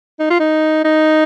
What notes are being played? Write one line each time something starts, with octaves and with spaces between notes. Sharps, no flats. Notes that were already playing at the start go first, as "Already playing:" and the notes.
D#4
F4
D#4
D#4